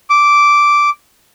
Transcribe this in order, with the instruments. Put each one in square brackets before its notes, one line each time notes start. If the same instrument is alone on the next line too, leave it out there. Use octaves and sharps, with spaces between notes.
[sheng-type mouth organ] D6